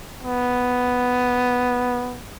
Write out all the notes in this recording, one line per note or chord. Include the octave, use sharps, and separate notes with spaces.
B3